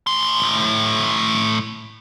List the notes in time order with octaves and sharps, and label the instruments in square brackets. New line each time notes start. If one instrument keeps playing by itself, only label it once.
[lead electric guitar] A2 C6